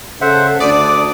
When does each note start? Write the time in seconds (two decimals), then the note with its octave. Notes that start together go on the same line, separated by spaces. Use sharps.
0.21 C#3 A4 C5 E5 F#5
0.60 D2 D4 D5 D6 D#6